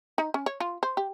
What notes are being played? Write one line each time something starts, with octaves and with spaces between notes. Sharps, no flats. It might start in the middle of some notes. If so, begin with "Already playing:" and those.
D#4
C#4
C#5
F4
C5
G4